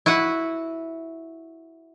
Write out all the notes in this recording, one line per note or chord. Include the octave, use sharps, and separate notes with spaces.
E4 F#4 B4 F#5